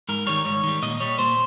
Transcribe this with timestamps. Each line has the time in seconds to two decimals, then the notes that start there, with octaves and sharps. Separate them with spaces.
0.09 G#2 A#4
0.27 D#3 G3 C#5
0.45 G#2 C#5
0.63 D#3 G3
0.82 A#2 D#5
1.00 G3 C#5
1.18 A#2 C5